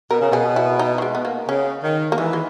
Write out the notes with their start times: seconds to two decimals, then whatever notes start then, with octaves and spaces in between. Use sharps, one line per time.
0.11 B2 A#4
0.20 C#3
0.31 B2 G#4
0.56 E4
0.79 D#4
0.98 F#3
1.02 G#3
1.15 B3
1.25 A#3
1.48 C#3 C#4
1.83 D#3
2.12 A#3
2.18 E3 G#3
2.33 G#3